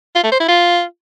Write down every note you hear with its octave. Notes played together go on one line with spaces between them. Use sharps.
F4
A3
C5
E4
F4